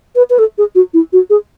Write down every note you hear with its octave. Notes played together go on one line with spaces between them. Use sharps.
B4
B4
A4
G#4
F#4
E4
F#4
G#4